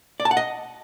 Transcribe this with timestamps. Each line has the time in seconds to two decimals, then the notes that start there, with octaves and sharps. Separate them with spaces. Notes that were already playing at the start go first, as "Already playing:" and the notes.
0.20 D5
0.25 A5
0.31 F#5
0.37 D#5